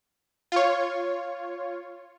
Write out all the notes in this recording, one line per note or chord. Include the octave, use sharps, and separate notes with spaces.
F4 C#5